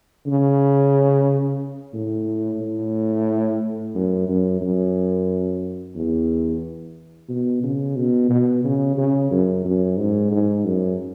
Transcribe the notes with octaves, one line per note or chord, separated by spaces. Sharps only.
C#3
A2
A2
F#2
F#2
F#2
E2
B2
C#3
B2
B2
C#3
C#3
F#2
F#2
G#2
G#2
F#2